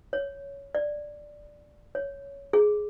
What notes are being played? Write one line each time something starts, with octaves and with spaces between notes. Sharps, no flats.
C#5
D5
C#5
G#4